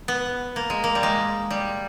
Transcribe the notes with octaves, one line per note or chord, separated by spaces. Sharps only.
B3
A#3
G#3
A#3
G3
G#3
G3